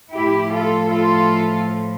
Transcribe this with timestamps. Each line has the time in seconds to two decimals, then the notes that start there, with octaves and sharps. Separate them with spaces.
0.13 A2 F3 E4 G4
0.52 F4 A4
0.90 F4 A4